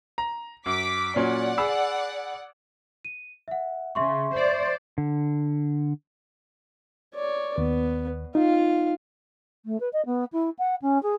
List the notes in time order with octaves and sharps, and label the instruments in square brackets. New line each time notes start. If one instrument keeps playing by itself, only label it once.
[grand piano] A#5
[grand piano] F#2 [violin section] D6 B6
[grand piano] A#2 F#3 C#4 [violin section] D5 F#5
[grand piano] G#4 B5 E6
[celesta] D#7
E5 F#5
[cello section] C#3 [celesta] E5 C6 C#6
[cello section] C5 D5
[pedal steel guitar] D3
[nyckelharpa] C#5 D5
[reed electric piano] D#2 [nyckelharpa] B3
[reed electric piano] D#4 [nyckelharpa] F4 F5
[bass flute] A3
B4
D#5
B3
E4
F#5
C#4
G#4